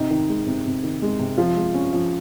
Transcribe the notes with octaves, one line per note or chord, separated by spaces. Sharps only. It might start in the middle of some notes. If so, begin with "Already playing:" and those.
Already playing: C3 D#4
D#3
G#3
C3
C3
D#3
G#3
C3
F3 F4
G#3
C#4
F3